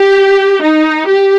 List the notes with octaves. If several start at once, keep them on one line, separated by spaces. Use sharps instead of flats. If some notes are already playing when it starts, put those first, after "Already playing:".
Already playing: G4
D#4
G4